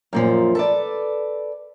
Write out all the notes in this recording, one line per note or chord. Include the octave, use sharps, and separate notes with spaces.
F#2 A#2 F3
A4 B4 D5